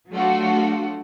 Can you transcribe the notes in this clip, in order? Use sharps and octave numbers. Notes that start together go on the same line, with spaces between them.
F#3 A3 D4 F4 F#4